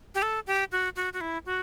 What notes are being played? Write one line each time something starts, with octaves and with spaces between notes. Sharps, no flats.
G4
A4
G4
F#4
F#4
F#4
E4
F#4